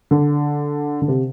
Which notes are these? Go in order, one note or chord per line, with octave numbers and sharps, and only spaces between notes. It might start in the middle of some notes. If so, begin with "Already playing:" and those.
D3
D3
C3